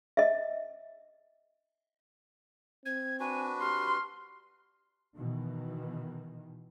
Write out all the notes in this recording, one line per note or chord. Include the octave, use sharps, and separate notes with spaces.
D#5 E5
C4 G#6
D4 F#4 B4 G#5
G4 C6 F6
B2 D#3 E3